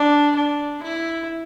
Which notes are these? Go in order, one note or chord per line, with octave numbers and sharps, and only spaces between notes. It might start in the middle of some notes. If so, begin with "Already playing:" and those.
Already playing: D4
D4
E4